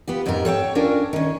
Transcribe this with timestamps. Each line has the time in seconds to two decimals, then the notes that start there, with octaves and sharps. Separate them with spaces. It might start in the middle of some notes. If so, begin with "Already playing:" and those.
0.07 B3 F4 G4
0.26 F2 G#2 C#3 G4 A#4
0.45 A4 C#5 F#5 G5
0.75 C#4 D4 F4 A#4
1.13 D#3 C#4